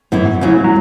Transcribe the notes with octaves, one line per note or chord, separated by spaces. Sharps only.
F#2 E3 B3 E4
E2 C#3 F#3 C#4 F#4
F#3